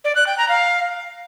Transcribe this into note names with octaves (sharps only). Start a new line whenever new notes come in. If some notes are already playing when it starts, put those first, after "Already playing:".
D5
F#6
G5
A#5
F5